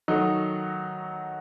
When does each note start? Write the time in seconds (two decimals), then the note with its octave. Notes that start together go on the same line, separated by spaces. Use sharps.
0.08 D#3 F#3 A3 D#4 F#4